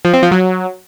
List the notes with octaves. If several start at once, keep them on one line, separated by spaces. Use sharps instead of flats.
F3
C4
F3
F#3